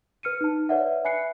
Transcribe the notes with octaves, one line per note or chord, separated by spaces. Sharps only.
B4 F6 C#7 D#7
D#4 A5
B4 C#5 D5 E5 F#5
E5 G#5 B5 F#6 C7 C#7